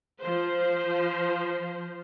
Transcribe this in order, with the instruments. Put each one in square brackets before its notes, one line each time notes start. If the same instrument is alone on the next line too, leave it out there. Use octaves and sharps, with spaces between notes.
[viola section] F3 C5